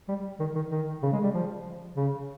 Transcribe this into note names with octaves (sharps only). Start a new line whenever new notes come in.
G3
D#3
D#3
D#3
C#3
G#3
G3
F3
C#3